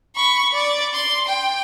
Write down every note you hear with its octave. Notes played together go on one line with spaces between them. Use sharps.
B5 C#6
D5
C6
G5